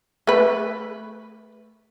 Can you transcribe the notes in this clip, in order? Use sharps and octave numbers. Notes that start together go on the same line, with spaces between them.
A3 B4